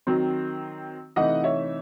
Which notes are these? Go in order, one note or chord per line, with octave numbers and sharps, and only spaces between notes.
D#3 F#3 C4
C3 E3 A3 D#4 D#5 F#5
C#5 E5